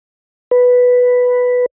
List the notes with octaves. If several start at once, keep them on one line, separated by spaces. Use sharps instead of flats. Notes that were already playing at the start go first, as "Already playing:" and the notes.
B4